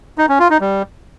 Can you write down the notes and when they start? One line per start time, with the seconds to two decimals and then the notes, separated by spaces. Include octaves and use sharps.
0.18 D#4
0.29 C#4
0.39 F4
0.50 D#4
0.61 G3